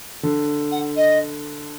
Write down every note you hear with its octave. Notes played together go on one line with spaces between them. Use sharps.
D3
F#5
D#5